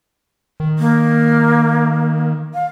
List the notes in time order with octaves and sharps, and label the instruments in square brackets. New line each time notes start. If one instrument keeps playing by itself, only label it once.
[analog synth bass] D#3
[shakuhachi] A#3
F5